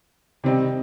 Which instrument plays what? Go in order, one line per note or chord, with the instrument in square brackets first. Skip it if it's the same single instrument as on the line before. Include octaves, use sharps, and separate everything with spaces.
[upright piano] C3 D#3 G3 C4 D#4